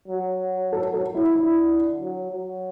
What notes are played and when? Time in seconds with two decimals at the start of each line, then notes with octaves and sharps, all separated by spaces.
0.08 F#3
0.73 A4
0.94 A4
1.15 E4
1.35 D3 E4
2.00 F#3
2.32 F#3